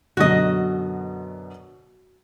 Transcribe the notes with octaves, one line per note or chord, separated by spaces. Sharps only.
F#2 B2 D3 F#4 D#5